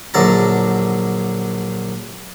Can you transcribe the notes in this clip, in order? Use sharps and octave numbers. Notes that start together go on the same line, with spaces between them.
A#1 D3 F#3 A5 A#5